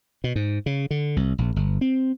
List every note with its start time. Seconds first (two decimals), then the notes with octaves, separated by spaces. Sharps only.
0.24 B2
0.36 G#2
0.66 C#3
0.91 D3
1.16 C2
1.38 A#1
1.56 G1
1.81 C4